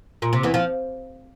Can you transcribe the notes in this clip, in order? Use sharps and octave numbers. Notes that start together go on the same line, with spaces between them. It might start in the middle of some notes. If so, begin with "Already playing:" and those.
A#2
C3
E2 E3
F3